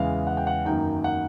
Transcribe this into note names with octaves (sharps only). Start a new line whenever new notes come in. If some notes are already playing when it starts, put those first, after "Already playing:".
Already playing: E2 C#3 E3 G#3 F5
F#5
G5
F#5
F#2 D#3 F#3 A#3 D#4 G5
F#5